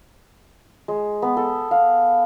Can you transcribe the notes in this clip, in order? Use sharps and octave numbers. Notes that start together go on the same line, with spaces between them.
G#3
B3
A4
F5